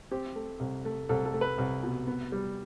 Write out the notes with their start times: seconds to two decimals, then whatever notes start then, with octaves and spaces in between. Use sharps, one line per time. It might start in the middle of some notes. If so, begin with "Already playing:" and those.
0.11 C4 G4
0.36 A3
0.60 C2
0.85 A3
1.09 C2 A4
1.25 A4
1.34 A3
1.41 B4
1.58 C2
1.83 B2
2.07 B3
2.32 G3